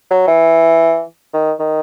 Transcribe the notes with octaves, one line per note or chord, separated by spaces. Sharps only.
F#3
E3
D#3
D#3